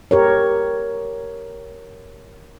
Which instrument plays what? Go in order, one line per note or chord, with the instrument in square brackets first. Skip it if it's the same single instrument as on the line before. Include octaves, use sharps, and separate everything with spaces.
[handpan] G4 A#4 C#5